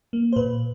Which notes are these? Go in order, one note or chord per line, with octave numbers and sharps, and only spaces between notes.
A#3
C5
A#2 B4